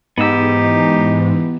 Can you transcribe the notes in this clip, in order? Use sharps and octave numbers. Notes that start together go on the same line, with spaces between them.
G#2 E3 B3 D#4 G4 E6